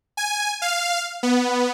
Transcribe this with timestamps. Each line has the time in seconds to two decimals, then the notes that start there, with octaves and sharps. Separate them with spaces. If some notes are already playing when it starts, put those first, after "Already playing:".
0.17 G#5
0.62 F5
1.23 B3